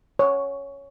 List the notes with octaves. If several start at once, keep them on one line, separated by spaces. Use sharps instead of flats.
C#5